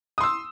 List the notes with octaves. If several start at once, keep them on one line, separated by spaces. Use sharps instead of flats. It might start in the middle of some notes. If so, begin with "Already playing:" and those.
C6 D#6 E6